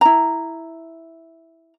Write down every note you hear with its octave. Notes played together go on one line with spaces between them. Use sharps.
E4 A#5